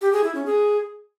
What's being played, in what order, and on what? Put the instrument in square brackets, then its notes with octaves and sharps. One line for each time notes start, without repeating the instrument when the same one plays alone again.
[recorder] G4
G#4
E4
C#4
G#4